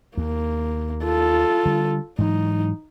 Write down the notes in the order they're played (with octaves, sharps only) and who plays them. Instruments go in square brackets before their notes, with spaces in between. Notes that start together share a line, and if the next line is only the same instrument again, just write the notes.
[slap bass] D#2 [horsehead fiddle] A#3
[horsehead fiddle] F4 A4
[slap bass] D3 G3
[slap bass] G#2 E3 F#3 [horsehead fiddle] D#4